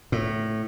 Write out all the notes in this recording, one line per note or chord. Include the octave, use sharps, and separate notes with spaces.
A2